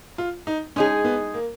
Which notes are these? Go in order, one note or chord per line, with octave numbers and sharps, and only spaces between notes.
F4
D#4
G#3 C#4 D#4 G#4
B3
A#3